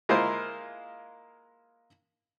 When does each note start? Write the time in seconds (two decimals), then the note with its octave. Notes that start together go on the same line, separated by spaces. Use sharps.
0.09 G#3 A#3 E4 F4 A#4 C5